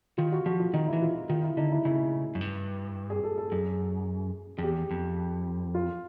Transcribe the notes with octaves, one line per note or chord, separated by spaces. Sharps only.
D#3 F4
F#4
F3 F#4
F4
D#3 D#4
E3 E4
F4
E4
D#3 F4
E4
D3 D#4
E4
C#3 E4
F#2
G2
G#4
A4
A4
F#2 G#4
F2 G#4
E2 G4
F2
F4